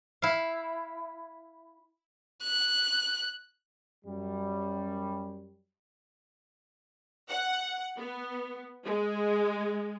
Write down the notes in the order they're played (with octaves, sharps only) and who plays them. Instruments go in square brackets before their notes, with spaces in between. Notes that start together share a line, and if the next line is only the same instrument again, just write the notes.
[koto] E4 F5
[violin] F#6
[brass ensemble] F#2 G3
[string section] F#5
B3
G#3